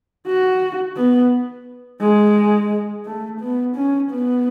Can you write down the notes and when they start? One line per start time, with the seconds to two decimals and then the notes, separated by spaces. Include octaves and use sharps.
0.27 F#4
0.96 B3
2.01 G#3
3.05 A3
3.41 B3
3.76 C#4
4.11 B3